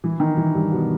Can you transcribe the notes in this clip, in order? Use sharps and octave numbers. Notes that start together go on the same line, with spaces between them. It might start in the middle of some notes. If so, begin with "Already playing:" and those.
E3
D#3
E3
G2 G3
B2 B3